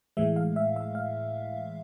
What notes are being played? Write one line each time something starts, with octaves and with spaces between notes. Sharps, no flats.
A2 E3 G#3 E5
F5
E5
E5
F5